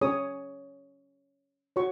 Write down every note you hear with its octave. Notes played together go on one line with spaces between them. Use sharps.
C#4 G#4 C#5 D#6
F#4 C#5 C#6